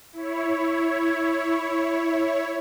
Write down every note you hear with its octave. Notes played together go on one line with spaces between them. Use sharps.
E4 C#5